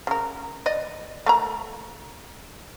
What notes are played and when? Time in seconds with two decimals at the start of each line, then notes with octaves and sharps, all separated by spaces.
0.07 C#3 A#4
0.66 D5 D#5
1.26 A3 A#3 A#5